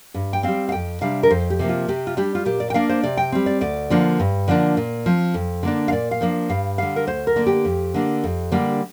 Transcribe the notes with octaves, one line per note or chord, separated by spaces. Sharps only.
G2
G5
G3 C4 F5
F5
F2 G5
C3 G3 D4 F5
A#4
F2 C5
G4
C3 F3 A#3
F4
C3 G4
F4
G3 D4 G4
F4
A#2 G4
D5
G5
A#3 D4 F5
C5
C3 D5
G5
G3 C4
D5
D2 D5
D3 F3 A#3 D4
G2
D3 F3 A#3 D4
A#2
F3 C4
F2
D3 A#3 D4
F5
A#2 D5
F5
F3 A#3 D4
G2 F5
D3 G3 F5
A#4
D2 C5
A#4
D3 A#3 D4
G4
F2
D3 A#3 D4
F2
D3 G3 A#3 D4